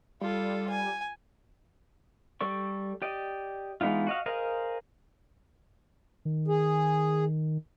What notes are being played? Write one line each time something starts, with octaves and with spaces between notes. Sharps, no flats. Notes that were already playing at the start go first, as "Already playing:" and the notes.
G3 F4 A4
G#5
G3 A4 D5 C#6
G4 D5 D#5
E3 G#3 B3 D#4 F4
F#4 D#5 F5
G#4 A#4 C5 D#5 F5
D#3
G#4